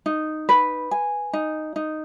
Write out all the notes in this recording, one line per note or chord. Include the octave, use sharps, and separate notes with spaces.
D#4
B4
G#5
D#4
D#4